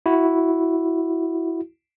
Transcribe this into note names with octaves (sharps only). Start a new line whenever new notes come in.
E4 F#4